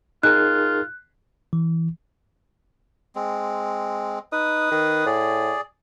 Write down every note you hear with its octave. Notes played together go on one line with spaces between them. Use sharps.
D#4 F4 G#4 A#4 F#6
E3
G#3 C4
D#4 B4 D#6
D#3
A2 G#4 D5